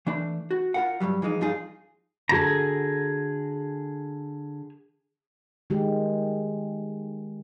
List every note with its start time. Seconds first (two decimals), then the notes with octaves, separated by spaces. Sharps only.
0.07 E3 A3 D4
0.51 F#4
0.74 F4 A#4 F#5
1.00 G2 A#2 F#3 G3
1.22 E3 F3 G#3 D#4
1.41 G2 F3 D#4 F4 G#4
2.29 D3 F#4 G#4 A4 A#5
5.70 D#3 G#3 G4